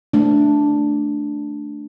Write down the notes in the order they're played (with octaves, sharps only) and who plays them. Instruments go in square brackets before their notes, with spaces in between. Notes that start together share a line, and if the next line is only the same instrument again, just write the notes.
[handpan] A3 D4